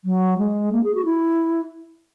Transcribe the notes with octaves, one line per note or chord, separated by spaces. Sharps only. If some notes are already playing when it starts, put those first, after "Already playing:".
F#3
G#3
A#3
G#4
F#4
E4